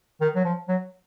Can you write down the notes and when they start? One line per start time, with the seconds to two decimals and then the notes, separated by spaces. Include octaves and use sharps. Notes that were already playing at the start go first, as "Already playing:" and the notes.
0.21 D#3
0.36 F#3
0.45 F3
0.68 F#3